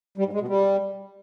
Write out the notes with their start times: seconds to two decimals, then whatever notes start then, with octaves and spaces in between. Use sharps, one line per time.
0.18 G3
0.25 G#2
0.33 G#3
0.40 B2
0.48 G3